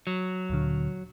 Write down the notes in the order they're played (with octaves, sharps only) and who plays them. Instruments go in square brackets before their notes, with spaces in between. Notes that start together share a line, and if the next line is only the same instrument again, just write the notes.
[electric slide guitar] F#3
[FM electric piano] D2 A#2 D3